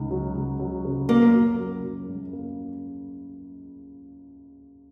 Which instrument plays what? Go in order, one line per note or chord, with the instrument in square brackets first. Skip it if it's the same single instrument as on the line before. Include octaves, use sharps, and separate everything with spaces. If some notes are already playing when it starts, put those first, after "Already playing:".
Already playing: [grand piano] C#2 D#4
F#3
C#2
F#3
C#3
[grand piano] F#2 [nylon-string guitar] A#3
[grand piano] F#3
F#3
F#3
F#2
A#3